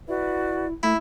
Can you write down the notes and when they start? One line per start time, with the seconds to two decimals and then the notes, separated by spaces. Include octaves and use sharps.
0.08 E4 F#4 B4 D5
0.83 A3 E4